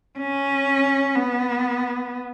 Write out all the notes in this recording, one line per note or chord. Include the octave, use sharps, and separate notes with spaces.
C#4
B3